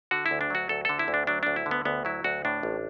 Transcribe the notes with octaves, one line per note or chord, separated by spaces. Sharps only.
D3 F#4
E4
D2
D4
F#3 F#4
D2 A4
D3 A4
E4
D2
D4
F#3 D4
D2 D4
E4
D3
B3
D2 B3
F#3 E4
D2 F#4
A2 D4
A1